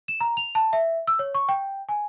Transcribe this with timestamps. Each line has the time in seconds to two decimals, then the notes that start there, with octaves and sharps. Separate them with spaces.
0.08 E7
0.20 A#5
0.37 F7
0.55 A5
0.73 E5
1.07 E6
1.19 C#5
1.35 C#6
1.49 G5
1.89 G#5